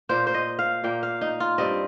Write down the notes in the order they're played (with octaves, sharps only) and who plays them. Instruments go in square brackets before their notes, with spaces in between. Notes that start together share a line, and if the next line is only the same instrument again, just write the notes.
[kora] A#2 A#3 C5
C5
D#5
F5
A#2 A#3 G5
F5
D#4
F4
G2 G3 C4 D#5